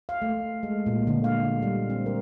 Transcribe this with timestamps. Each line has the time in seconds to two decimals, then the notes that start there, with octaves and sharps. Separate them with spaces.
0.09 F5
0.22 A3
0.63 G#3
0.86 A#2
1.07 D3
1.24 F5
1.62 G3
1.90 C4
2.06 A#4